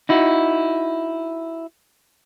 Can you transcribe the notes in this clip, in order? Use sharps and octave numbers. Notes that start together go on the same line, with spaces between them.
D#4 E4 F#4